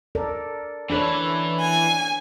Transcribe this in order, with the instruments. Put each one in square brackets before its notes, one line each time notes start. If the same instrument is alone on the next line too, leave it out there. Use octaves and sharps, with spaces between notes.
[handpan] A4 A#4 D5
[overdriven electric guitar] E3 B4 [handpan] D4 A4 C#5
[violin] G#5